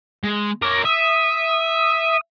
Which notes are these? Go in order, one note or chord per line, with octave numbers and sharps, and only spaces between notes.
G#3
A#4 C#5 D6 A#6
E5 D#6